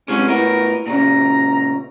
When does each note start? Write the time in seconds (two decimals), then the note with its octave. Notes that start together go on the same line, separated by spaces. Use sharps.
0.08 C3 G#3 C#4
0.28 A2 B3 A#4
0.86 A#2 C#3 A#5